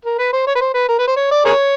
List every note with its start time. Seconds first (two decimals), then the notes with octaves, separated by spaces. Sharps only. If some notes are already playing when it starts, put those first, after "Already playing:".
0.05 A#4
0.19 B4
0.33 C5
0.47 C#5
0.55 B4
0.61 C5
0.74 B4
0.89 A#4
0.99 B4
1.08 C5
1.17 C#5
1.31 D5
1.45 G#4 A#4 C#5